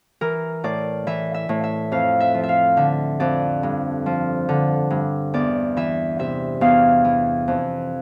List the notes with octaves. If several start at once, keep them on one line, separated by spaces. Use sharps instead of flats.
E3 A#4
A2 D5
E3 E5
E5
A2
E5
F2 F5
E5
F3
E5
F5
D3 E5
F2 D5
G2
F3
D3
G2
E2 D5
E3 E5
C3 E5
E2 F5
E3
F2